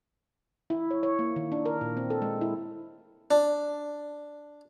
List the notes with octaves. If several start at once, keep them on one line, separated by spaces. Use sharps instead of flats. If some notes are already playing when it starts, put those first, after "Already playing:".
E4
C#5
C#5
A#3
D#3
D4
A#4
A#2
C4
A4
G#3
E4
D4